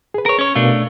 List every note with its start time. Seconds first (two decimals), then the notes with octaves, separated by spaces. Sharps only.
0.14 G#4 B4
0.26 A#4 C#5
0.39 C#4 C#5
0.55 B2 A3 D4 A#4 F5